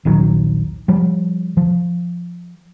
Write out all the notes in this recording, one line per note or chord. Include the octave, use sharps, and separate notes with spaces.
D#1 A#1 D#3 F#3
F3 G3
F3